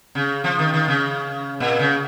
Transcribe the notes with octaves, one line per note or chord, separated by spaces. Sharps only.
C#3
F3
D#3
D#3
C#3
A#2
C#3